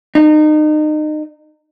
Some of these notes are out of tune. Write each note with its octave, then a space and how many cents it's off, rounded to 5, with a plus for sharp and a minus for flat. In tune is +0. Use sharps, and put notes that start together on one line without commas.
D#4 -30